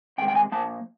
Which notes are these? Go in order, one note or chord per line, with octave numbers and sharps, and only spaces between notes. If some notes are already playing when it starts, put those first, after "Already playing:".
C3 D#3 G#3 G5
G5
G#5
A#2 F3 A#3 A5